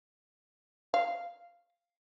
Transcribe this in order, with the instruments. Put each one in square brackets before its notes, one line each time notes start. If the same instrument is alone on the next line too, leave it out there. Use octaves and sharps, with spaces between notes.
[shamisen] F5